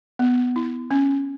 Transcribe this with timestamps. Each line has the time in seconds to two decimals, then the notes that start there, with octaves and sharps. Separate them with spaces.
0.19 B3
0.56 E4
0.91 C#4